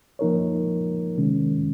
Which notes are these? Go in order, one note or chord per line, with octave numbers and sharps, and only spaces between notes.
F3 A#3 D#4 A#4 C#5
C3 D#3 G#3 C#4